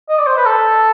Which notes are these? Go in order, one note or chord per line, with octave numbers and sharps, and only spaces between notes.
D#5
D5
C5
B4
A4